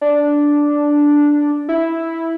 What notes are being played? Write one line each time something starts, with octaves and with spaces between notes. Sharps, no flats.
D4
E4